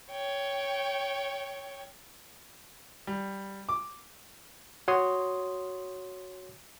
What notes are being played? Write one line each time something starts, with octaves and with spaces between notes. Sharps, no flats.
C#5 G5
G3
D6
F#4 C#5 C6 D#6